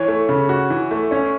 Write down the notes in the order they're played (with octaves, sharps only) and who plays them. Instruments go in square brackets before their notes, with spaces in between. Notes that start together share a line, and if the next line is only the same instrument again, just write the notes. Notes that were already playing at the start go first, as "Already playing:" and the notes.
Already playing: [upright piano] E3 [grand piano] C#5
[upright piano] A3
C#3
F#4
E3
A3
[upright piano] C#4 [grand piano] C#5